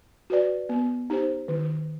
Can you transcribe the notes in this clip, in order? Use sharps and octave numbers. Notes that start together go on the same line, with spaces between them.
F#4 B4 D5
B3
D#4 G4 C5
D#3